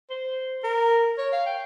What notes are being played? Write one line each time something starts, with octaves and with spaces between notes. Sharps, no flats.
C5
A#4
C#5
F5
G5